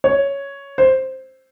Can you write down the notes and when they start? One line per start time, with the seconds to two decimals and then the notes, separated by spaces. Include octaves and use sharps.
0.04 C#5
0.78 C5